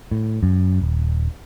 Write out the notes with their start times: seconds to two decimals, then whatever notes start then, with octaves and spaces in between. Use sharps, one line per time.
0.11 A2
0.43 F#2
0.81 D#1